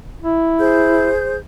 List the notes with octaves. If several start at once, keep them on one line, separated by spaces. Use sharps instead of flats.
E4
G#4 C5 G6